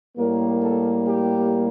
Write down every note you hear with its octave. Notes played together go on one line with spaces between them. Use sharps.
A2 G3 A#3 A#4
A4
G4